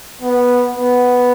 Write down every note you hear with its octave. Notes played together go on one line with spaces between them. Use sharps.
B3
B3